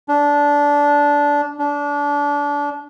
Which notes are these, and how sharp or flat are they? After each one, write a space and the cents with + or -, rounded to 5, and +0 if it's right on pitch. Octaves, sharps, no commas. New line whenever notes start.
D4 -15
D4 -25